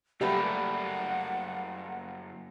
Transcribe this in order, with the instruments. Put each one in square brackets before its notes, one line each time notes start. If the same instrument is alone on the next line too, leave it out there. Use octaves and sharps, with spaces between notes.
[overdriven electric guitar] F#2 A#3 [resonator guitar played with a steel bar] G3 A3 B4 [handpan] G4 [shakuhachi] F#5